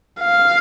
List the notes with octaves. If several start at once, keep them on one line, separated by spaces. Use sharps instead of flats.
F5